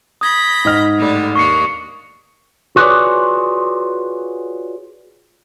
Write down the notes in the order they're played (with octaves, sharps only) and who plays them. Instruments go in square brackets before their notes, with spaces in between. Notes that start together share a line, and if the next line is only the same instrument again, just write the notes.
[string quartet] B5 G6 A#6 [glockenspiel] D#6 G#6
[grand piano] G#2 D#5 F6
[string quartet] A2 D3 G3
[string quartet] D#2 A#3 D4 [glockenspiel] C#6 C7 C#7
[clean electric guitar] F4 F#4 G#4 B4 C#5 D5